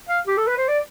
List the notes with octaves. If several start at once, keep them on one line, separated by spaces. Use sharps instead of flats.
F5
G4
A4
B4
C5
D5